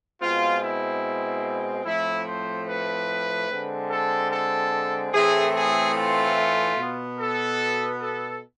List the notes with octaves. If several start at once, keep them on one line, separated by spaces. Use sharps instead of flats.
B2 G#3 C4 F4
E4
A2 F3 A3 C4 E4
C5
B4
D3 G#3 C4
A4
A4
A2 E3 A3 C4 G#4
G#4
F4
B2 B3
A4
A4